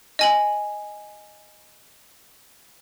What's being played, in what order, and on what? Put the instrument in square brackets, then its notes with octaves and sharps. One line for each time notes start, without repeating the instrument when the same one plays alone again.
[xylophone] D#5 G#5 F#7